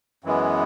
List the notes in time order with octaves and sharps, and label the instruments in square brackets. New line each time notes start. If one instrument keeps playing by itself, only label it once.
[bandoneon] F#2 E3 G#3 B3